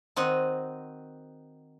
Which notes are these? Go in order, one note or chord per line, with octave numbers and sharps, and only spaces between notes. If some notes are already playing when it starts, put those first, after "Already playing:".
D#3 C4 F#4 D#5